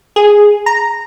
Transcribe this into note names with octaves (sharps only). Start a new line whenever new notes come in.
G#4
A#5